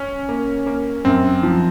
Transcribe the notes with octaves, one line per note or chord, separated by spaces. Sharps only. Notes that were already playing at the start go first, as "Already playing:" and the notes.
Already playing: C#4
A#3
A#3
F#2 C4
F3